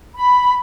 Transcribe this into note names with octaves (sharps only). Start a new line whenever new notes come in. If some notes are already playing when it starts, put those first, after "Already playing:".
B5